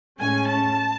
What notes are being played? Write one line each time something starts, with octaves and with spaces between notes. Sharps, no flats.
A2 G#3 C#4 G#5
A5